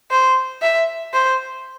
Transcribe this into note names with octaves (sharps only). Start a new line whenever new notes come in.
C5
E5
C5